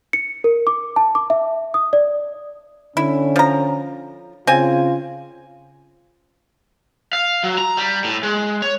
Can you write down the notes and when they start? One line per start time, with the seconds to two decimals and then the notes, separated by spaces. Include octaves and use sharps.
0.13 C#7
0.44 A#4
0.67 D6
0.96 A5
1.15 D6
1.30 E5
1.74 D#6
1.93 D5
2.97 D3 C#4 E4
3.36 F3 A#5
4.47 C#3 C4 F4 G#5
7.13 F5
7.44 F#3
7.58 A#5
7.77 G3
8.04 A2
8.23 G#3
8.62 C#5